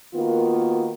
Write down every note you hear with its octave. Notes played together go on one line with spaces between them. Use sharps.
D#3 A#3 B3 F4 F#4